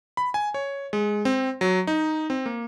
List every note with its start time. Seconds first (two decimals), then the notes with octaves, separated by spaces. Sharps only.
0.17 B5
0.34 G#5
0.54 C#5
0.93 G#3
1.25 C4
1.61 F#3
1.87 D#4
2.30 C4
2.46 A#3